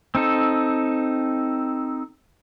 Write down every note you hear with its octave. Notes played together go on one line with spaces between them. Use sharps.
C4 D#4 A4